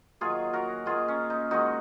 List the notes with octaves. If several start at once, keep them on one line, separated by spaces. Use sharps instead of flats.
D#3 F#3 A#3 F4 G#4
F#4 A#4
D#3 A#3 F4 G#4
C#4
D#4
D#3 G#3 D#4 F#4